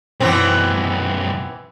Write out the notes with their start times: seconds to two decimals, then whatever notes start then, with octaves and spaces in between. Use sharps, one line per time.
0.20 B1 F#2 E3 B3 C4